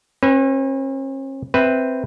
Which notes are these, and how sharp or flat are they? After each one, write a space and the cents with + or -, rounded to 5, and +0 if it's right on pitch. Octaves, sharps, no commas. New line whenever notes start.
C#4 -45 B4 +0
C4 +0 B4 +0 E5 -10